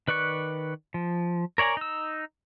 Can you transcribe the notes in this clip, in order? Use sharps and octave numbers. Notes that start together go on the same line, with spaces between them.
D#3 B4 D5 C#6 F#6
F3
A#4 C#5 D5 G#5 A#5
D#4 E6